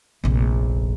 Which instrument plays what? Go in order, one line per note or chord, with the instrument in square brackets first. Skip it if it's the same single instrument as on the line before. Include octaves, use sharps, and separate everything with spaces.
[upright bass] F1 A#1